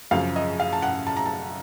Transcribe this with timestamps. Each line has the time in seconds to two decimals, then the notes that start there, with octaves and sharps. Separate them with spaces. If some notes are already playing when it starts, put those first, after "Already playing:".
0.11 F#2 C#3 F3 F5
0.36 D#5
0.60 F5
0.73 A5
0.82 F#5
1.07 A5
1.17 A#5
1.26 A5